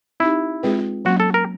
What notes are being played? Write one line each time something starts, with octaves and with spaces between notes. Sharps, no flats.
C4 D#4 E4 G4
G#3 C4 F4 G#4 B4
F#3 A#3 C#4 F#4
A4
A#4